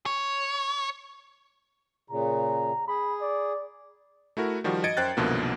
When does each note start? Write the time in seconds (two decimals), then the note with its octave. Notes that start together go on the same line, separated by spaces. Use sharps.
0.06 C#5
2.10 A#2 C#3 A#5
2.88 G#4 B5
3.21 D5
4.37 A3 E4 F#4 A#4
4.64 D#3 F3 G3 F#4
4.84 D#5 G#6 A6 C#7 D7
4.97 F#2 C5 G5 F#6 G#6 A6
5.17 C2 F#2 B2 D3 F3 A#3